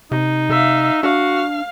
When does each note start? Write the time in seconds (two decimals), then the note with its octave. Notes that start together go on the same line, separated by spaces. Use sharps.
0.11 C3 D#4
0.49 C3 E5 F5
1.03 D4 F#4 F5